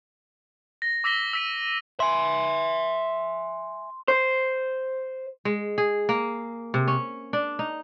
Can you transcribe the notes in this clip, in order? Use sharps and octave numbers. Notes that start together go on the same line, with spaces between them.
A#6
D6 E6 A#6 B6 G7
E6 B6 D#7
E5 G#5 C6
C5
G#3
G#4
A#3
C3
C#4
D4
D#4